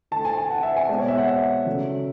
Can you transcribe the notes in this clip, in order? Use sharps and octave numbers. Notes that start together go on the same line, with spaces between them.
D3 A3 A5
G#5
G#5
F#5
E5
G#5
B2 G#3 D5
C#5
E5
F#5
E5
C#3 F#3 A3